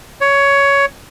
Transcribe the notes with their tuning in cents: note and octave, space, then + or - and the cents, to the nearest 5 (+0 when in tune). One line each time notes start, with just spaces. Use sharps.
C#5 +15